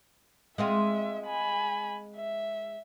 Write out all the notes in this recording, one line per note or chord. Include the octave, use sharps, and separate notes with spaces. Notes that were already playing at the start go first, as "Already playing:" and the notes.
G#3 C4 F4 E5
G#5 B5
E5